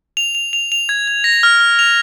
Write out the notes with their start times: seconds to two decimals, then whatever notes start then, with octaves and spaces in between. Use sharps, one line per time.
0.17 F7
0.35 F7
0.53 F7
0.72 F7
0.89 G#6
1.07 G#6
1.24 A#6
1.43 F6
1.60 F6
1.79 F7